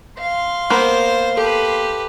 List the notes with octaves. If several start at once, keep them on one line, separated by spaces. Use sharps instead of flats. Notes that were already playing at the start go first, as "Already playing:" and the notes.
F5 C6
A#3 B3 C5
G4 A4 B4